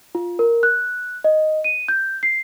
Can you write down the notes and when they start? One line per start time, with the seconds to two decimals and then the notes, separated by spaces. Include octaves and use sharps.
0.15 F4
0.39 A#4
0.63 F#6
1.24 D#5
1.64 D#7
1.88 G6
2.23 C7